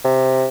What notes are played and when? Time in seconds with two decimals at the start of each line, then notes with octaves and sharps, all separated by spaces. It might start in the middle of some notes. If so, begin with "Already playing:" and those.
0.04 C3